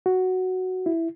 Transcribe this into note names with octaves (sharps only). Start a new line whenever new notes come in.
F#4
E4